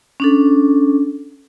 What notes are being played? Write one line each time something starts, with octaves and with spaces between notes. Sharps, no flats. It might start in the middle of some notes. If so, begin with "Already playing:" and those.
C#4 D4 A4